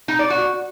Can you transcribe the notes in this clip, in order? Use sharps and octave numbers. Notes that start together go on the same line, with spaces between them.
D#4
D5
F#4